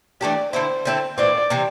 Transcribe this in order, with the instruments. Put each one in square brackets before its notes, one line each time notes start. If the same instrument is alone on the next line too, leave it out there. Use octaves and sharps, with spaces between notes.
[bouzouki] E3 A3 D4 G4 [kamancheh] D5
[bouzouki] D3 C4 E4 [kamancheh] C5
[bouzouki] D3 C4 E4 A4
[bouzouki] A2 E3 C4 [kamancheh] D5
[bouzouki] C3 E3 C4